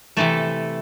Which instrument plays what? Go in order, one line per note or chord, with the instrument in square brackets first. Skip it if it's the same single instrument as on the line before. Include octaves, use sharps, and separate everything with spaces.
[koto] C3 E3 A3 A4